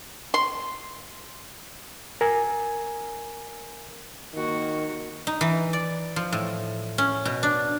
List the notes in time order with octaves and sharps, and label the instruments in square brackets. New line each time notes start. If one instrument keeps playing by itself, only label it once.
[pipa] C6
[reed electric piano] A#4 G#5
[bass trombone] D#3 [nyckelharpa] A#3 F#4
[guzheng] D#4
E3
D5
F3
A2
C#4
B2
D4